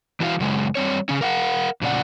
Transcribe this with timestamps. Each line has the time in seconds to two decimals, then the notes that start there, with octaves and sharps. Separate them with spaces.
0.20 E3 E4 F#4 E5 F5
0.40 F#2 C#3 G#3
0.75 G3 C4 C#5
1.09 C#3 C#4
1.21 A#4 F5 F#5
1.81 F2 A#2 C#3 D5 F#5